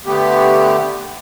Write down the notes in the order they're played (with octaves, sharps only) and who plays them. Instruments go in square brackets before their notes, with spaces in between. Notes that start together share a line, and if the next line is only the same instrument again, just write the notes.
[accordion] D3 A3 B3 G4